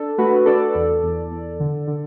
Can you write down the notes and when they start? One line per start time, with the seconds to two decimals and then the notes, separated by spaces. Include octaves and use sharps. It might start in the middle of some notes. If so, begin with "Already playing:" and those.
Already playing: D4 A4
0.18 A3 F#4 B4
0.46 D4 A4 D5
0.75 E2
1.03 E2
1.31 E2
1.60 D3
1.88 D3